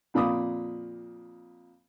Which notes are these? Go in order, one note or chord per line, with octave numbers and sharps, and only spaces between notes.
F2 A#2 B5 D6 D#6